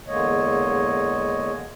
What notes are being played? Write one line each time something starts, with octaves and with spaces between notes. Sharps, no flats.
E2 D3 G#3 A#3 C#5 D#5